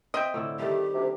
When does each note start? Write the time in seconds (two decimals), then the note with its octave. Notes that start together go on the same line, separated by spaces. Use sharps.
0.14 C4 D#5 E5 G5
0.34 A2 D3 E4
0.59 D#3 G3 A3 G4
0.94 D2 C3